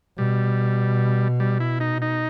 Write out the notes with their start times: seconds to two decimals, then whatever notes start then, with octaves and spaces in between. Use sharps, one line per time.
0.18 B2 G3
1.40 G3
1.60 E4
1.80 D#4
2.02 D#4